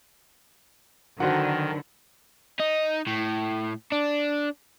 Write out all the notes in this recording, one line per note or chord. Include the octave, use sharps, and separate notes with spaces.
D3 D#3 F#3 D#4 F#4 B4 C5 F#5
D#4
A2
D4